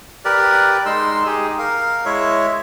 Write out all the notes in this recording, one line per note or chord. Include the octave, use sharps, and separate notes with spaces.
G4 A#4 B4 D5
G#3 D#4 C6 E6
D#4 G4 G#4
A#4 F5
G#3 E4 C#5 E5